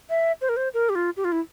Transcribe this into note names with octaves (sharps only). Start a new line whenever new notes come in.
E5
C5
A#4
C5
A#4
G4
F4
G4
F4
E4